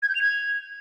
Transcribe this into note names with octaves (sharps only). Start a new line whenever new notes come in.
G#6
G6
F7
G#6